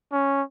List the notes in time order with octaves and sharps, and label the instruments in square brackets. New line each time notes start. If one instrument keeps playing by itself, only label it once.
[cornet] C#4